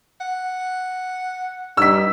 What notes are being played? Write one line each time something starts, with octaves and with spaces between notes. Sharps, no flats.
F#5
G2 G3 D#4 E6 B6